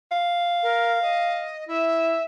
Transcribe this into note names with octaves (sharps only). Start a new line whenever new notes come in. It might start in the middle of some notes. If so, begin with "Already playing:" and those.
F5
A#4
D#5
E4 E5